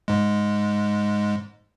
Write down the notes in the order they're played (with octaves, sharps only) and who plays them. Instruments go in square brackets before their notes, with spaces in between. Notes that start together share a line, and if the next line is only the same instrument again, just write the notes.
[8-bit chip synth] G#2 G#3